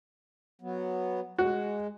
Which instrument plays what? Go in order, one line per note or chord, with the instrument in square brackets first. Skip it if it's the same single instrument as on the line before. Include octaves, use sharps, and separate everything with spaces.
[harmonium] F#3 B3
[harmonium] G#3 [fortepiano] F#4